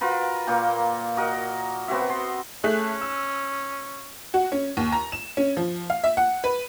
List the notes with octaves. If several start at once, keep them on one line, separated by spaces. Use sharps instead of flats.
F4 F#4 A#4 B4
A#2 A#3 A#4 G5
F#4 A#4 D#5
B3 C4 F#4 E5
C6
A3 C#4 G#4 F#6
E6
F#4
C#4
D#2
A#5
E7
C#4
F3
F5
E5
F#5
B4